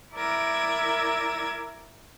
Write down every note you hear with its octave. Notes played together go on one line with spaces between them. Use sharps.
E4 A#4 D5 E6 G#6 A#6